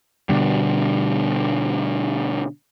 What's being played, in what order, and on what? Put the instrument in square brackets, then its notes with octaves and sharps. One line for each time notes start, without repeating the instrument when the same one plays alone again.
[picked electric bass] B2 D3 G3